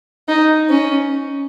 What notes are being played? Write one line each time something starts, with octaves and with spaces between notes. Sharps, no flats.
D#4
C#4